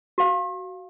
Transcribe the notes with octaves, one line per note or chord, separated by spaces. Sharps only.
F#4 F5